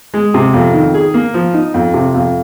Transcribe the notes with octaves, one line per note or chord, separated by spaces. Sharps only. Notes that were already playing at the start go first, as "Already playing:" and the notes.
G#3
C3
F2
D#3
G#4
A#3
F3
D#4
F2
C3
F2